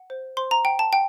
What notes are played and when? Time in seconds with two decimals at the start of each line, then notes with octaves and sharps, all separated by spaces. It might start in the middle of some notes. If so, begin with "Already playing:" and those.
Already playing: F#5
0.10 C5
0.37 C5 C6
0.51 A#5
0.65 F#5 G5
0.79 A5
0.93 F#5 G5